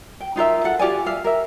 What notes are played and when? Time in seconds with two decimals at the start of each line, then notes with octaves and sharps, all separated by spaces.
0.20 G5
0.36 D#4 F4 A#4 E5
0.64 A4 F#5
0.79 F4 G4 D5 G#5
1.06 E5 F5
1.24 A#4 E5